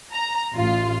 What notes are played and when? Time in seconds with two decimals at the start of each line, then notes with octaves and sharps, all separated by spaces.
0.12 A#5
0.55 A1 F4